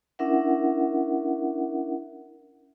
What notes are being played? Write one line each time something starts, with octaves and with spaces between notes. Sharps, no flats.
C#4 D4 E4 A#4 E5 F#5